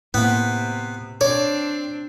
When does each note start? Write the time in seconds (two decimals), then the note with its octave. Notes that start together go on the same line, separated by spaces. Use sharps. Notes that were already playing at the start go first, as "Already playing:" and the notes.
0.14 A2 C3 A#3 B3
1.21 C4 D4 C#5 D5